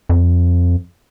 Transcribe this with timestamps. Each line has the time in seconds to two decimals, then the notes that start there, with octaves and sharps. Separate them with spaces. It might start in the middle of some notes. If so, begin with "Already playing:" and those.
0.09 F2